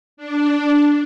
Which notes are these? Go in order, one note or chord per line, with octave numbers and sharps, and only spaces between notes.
D4